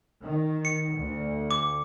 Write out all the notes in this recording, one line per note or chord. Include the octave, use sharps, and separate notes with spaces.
D#3
C#7
D2
D6